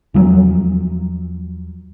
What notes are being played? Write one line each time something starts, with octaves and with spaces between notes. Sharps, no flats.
E2 F3 F#3